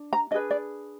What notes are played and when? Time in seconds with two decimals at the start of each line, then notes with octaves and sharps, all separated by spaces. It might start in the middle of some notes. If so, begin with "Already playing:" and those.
Already playing: D4
0.13 A#5
0.31 D4 G#4 B4 D#5
0.51 D5